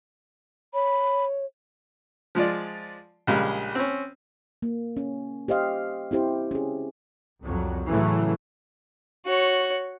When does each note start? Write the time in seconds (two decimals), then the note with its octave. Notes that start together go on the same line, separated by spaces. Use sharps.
0.74 C#5 B5
2.35 F3 G#3 F4 D5
3.27 A#1 C#3 G3 G#3
3.75 C4 C#4
4.62 A#3
4.97 C#4
5.48 G4 C5 D#5 F5
6.11 C4 E4 G4 C5
6.51 C#4 G#4
7.41 C2 F2 F#3
7.89 A2 C#3 E3 F#3 A3
9.26 F#4 C#5